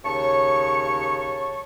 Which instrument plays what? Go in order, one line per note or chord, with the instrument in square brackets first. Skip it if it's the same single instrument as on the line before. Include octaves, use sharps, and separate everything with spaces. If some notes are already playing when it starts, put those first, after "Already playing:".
[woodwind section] D#2 C#3 C#5 A5 C#6